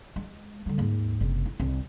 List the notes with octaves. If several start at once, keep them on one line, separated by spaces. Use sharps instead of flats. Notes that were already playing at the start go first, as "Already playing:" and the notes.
G#3
D3 G3
D#2 G#2
F#1 C3
E4
C2